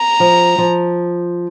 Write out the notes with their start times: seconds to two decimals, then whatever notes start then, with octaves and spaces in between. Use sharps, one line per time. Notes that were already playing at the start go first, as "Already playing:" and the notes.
Already playing: A#5
0.20 F3
0.58 F3